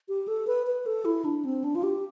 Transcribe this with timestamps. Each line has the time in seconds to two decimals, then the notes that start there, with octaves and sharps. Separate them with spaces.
0.09 G4
0.28 A4
0.47 B4
0.67 B4
0.86 A4
1.05 E4
1.25 D4
1.45 C4
1.64 D4
1.75 F4
1.83 G4